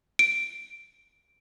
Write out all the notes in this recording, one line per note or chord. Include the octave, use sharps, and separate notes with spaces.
D7